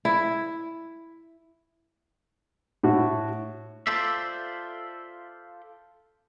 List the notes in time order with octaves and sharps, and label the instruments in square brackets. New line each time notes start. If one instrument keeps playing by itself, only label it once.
[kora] E4
[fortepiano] A2 F#4
[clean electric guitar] F4 A4 C5 D5 E5